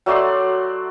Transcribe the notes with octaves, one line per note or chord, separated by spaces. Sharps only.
F#3 A3 D5 C6